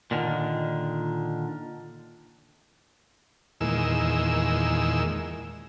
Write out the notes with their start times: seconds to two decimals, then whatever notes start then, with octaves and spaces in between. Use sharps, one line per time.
0.11 A#2 D3 D#3
3.61 E2 A#2 D#3 G#3 E6